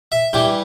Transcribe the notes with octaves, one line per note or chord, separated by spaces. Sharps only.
E5
G2 E3 G3 G5